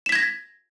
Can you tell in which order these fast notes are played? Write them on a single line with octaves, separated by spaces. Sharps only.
E7 B6 G#6 A#6